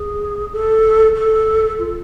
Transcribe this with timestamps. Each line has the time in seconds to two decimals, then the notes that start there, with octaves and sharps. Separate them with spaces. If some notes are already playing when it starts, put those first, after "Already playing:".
Already playing: G#4
0.52 A4
1.15 A4
1.79 F4